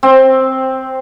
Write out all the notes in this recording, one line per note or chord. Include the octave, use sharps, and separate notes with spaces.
C4